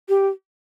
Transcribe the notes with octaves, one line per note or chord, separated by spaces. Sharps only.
G4